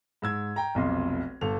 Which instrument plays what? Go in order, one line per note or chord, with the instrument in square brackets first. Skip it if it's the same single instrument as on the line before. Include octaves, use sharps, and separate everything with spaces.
[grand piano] G#2 E6 G#6
G5 A#5
F1 B1 F2 D#5 C6
G1 A4 F7